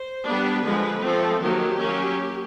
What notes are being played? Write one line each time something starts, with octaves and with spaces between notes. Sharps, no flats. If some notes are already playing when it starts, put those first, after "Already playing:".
Already playing: C5
G3 B3 D4 B4
D3 F3 G#3
F3 A3 C4 A4
D#3 F#3 A#3 G4
F#3 A#3 C#4